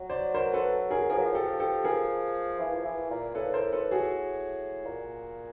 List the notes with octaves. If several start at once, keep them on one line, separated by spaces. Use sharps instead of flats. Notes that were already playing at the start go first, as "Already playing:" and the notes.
Already playing: F#3
C5 D5
A#4 C5
A4 B4
G#4 A#4
F3 G#4 A#4
F#3
F3
G4 A4
G4 A4
G#4 A#4
E3
F3
E3
A#2
A2 A4 B4
A#4 C5
A4 B4
F#4 G#4
A#2